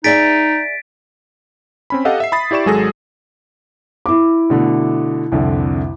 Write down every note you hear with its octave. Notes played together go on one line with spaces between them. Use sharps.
D#4 G#4 D5 E5 A6 B6 D7
C4 C#4 B5
G4 A4 D#5 F5 F#5
E5 C7
B5 D#6 A6 B6
E4 G4 D5 C#6 E7
G#1 F#3 G#3 G#4 A4 A#6
E4 D6
B2 D3 A3
C2 F2 D3